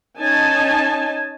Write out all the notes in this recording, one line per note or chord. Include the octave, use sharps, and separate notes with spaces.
C#4 D#4 D#5 G#5 A5